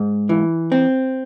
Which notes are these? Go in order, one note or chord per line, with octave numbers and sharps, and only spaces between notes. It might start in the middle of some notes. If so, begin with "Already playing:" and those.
Already playing: G#2
E3
C4